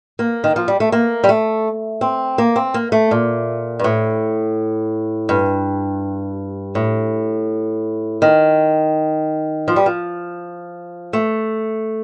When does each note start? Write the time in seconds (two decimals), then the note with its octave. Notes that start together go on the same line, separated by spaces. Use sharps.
0.19 A#3
0.44 D#3
0.56 F3
0.68 G3
0.80 A3
0.92 A#3
1.24 G3
1.29 A3
2.01 C4
2.38 A#3
2.56 C4
2.74 A#3
2.92 A3
3.11 A#2
3.79 G2
3.84 A2
5.29 G2
6.75 A2
8.22 D#3
9.68 F3
9.76 G3
9.86 F3
11.13 A3